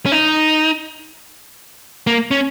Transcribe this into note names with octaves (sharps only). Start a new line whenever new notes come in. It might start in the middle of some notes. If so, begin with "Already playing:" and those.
C#4
D#4
A#3
C#4